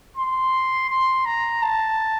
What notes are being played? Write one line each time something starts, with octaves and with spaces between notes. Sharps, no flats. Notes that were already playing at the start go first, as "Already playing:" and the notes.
C6
C6
A#5
A5